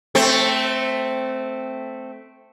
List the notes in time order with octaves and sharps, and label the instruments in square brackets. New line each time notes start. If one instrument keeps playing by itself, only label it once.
[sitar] A3 C4